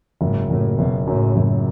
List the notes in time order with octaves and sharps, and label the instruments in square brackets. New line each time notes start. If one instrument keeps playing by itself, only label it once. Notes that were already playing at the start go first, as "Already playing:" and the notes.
[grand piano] F#1 [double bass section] G#2
[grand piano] F#1 [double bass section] A2
[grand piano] F#1 [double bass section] B2
[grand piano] F#2 [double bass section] A2
[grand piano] F#1